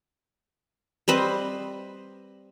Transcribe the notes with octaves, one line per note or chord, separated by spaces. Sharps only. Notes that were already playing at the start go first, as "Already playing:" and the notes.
G3 C4 B4 D#5